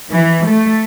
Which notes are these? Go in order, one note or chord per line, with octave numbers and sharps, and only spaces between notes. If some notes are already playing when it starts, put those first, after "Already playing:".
E3
A3